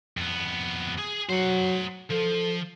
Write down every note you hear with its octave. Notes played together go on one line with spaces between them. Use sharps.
F2 B3
G#4
F#3 C5 F#5
F3 A4